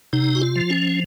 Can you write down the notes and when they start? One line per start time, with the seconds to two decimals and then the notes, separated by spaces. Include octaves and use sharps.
0.13 C3 D#4
0.35 F#4
0.41 F4
0.56 F3
0.70 C#4